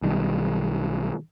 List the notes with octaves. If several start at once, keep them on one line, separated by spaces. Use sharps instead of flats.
B1 D#3 G3